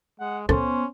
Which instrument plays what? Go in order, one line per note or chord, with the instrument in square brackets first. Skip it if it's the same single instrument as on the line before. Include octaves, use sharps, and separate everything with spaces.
[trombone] G#3 [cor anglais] F#5
[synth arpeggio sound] C#2 A#2 A4 [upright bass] B3 [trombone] C#4 [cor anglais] C5